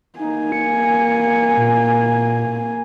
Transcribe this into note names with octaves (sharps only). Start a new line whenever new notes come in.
A#3 D#4 G#5
C#7
A#2